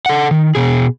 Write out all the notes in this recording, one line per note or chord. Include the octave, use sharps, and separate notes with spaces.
A4 F#5
D#3
B2 G#4